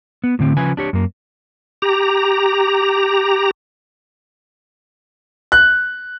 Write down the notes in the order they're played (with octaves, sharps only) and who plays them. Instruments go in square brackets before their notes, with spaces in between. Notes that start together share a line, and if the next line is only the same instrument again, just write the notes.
[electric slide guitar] B3
A2 D3 C4
C#3 F3 B4 G#5
D4 G4 C#5
F#2 A#3
[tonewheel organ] G4 A#5
[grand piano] F#6